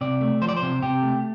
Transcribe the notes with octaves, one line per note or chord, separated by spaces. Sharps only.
C3 D5
A3
F3 C5
D5
C5
C3
C3 G4
A3